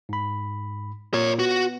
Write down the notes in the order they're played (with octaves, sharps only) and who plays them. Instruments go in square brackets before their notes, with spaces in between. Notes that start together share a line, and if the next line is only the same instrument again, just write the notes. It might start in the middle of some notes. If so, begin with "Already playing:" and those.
[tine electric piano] G#2 B5
[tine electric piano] A#2 [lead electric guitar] A#4 C#5
[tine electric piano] B3 [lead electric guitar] F#4